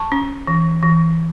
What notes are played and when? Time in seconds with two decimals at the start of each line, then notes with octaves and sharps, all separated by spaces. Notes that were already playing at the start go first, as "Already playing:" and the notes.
Already playing: A5 C#6
0.12 C#4
0.47 E3
0.83 E3